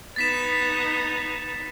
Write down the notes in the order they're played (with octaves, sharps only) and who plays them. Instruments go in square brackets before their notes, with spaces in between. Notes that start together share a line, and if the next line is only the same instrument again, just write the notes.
[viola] B3 D#4 [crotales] A6 B6 E7